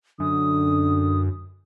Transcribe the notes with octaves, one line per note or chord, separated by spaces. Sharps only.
F#2 D3 D#6